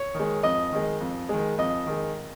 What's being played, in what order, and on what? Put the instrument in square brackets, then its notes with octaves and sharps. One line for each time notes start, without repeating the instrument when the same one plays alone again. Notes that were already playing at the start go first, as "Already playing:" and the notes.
Already playing: [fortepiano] C#5
D#3 G#3
F2 D#5
D#3 G#3
F2
D#3 G#3
F2 D#5
D#3 G#3